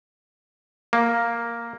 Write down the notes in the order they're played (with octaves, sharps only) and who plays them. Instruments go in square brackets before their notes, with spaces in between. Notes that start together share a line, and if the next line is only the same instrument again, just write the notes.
[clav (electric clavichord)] A#3